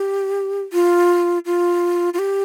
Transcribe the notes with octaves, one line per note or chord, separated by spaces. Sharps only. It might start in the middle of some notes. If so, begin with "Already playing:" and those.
Already playing: G4
F4
F4
F4
G4